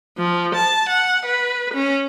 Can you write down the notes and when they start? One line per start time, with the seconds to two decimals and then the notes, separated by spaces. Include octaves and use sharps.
0.17 F3
0.55 A5
0.89 F#5
1.25 B4
1.74 C#4